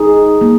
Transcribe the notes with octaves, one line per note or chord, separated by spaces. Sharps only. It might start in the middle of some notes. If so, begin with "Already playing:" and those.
Already playing: D#4 G#4
A#3